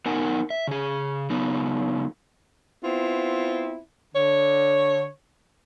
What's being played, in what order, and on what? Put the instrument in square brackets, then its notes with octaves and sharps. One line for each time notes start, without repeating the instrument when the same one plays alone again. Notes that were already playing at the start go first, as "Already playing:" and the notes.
[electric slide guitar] B3 D#4 A#4 F#5 G#5
E5
C#3 G#4
C#3 F#3 B3 D#4
[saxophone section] B3 C4 E4 F4
D3 C#5